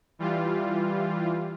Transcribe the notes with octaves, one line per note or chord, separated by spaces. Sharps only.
E3 G3 F4